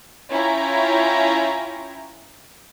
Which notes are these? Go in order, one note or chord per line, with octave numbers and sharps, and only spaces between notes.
C#4 E4 F4 C#5 G5 A#5